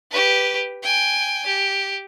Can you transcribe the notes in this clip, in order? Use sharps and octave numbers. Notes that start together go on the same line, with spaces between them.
G4 B4
G5 G#5
G4